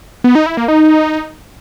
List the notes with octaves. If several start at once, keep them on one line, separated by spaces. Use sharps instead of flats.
B3
D#4
E4
A#3
D#4